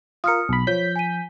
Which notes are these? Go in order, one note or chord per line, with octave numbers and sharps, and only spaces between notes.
F4 A#4 D#6 F6 C#7
B1 B5
F3 C#5 G6 B6
G#5 D#7